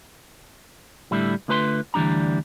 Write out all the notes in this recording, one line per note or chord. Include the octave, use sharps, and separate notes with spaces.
A2 D3 G3 E4
D3 A3 F4 B4 A#5 C6
D2 E3 G3 D4 A#5